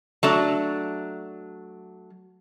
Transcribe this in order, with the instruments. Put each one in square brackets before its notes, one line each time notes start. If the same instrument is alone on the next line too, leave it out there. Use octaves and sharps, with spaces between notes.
[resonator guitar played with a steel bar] F#3 A3 D4